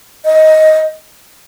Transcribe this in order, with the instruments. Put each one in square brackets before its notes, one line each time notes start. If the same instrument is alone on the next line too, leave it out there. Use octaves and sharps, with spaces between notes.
[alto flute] D#5